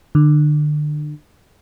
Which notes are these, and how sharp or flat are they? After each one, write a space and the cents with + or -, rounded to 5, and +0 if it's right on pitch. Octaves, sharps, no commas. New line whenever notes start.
D3 +35